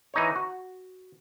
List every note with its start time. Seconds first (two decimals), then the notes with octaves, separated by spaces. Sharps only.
0.14 E3 D#4 C#5
0.36 F#4